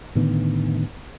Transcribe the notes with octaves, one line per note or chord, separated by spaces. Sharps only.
A2 D3 D#3 B3